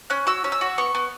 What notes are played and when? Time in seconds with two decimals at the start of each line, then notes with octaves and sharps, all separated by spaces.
0.10 C#4 F#6
0.27 F#4 E6
0.44 C#4
0.52 E6
0.61 F#4
0.78 B3 C#6
0.95 B3